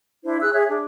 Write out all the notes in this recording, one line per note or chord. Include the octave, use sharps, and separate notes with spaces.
D4 E4 C5
G#4 E6 F#6
G#4 C#5 E5
D4